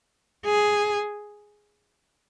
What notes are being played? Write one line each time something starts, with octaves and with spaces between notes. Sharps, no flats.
G#4